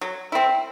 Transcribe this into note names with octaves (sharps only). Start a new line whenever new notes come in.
F#3
C4 E4